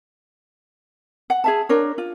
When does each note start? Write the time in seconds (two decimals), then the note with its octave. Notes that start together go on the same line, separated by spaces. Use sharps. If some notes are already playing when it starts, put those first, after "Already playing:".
1.30 F#5
1.44 G#4 E5 A5
1.69 D4 A#4 C#5
1.98 F4